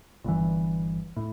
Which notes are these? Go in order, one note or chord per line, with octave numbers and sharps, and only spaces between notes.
G1 G2 E3
A2